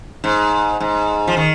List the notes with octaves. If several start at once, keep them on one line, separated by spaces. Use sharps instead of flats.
G#2
G#2
F3
D#3